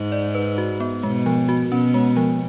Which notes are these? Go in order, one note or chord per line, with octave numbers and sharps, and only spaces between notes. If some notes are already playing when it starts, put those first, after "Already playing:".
Already playing: G#2
D5
B4
F#4
B3
B2 G#3
F3
F#4
B2 C#4
G#3
F3